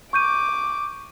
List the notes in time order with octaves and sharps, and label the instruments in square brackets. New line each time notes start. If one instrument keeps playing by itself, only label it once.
[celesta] C#6 G6 D#7 [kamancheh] D6